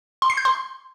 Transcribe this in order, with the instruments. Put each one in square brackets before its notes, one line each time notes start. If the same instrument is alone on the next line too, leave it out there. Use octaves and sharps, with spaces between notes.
[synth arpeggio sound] C6
C7
G6
C6